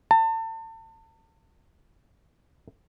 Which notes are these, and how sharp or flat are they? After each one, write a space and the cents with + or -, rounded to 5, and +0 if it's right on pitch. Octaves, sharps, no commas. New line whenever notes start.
A5 +35